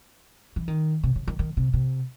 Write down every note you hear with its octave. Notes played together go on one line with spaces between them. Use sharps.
E3
D#3
C3
C#3
D#3
D#3
C3
C3